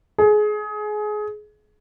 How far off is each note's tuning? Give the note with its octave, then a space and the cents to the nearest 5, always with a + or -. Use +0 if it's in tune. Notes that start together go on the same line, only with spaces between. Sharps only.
G#4 +25